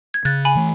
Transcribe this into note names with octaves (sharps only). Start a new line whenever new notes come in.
G#6
C#3 F#6 A6
G#5 B5
E3 A3